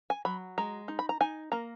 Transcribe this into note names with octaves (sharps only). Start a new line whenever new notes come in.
G#5
F#3 B5
G#3 A#5
D#4
B5
A#5
D#4 G#5
A#3 A#5